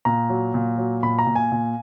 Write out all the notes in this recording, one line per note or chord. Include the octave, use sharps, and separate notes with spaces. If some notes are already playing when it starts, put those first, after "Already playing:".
A#2 A#5
F#3
A#2
F#3
A#2 B5
A#5
A#2
G#5
A#2